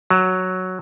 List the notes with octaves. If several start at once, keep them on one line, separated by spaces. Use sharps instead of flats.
F#3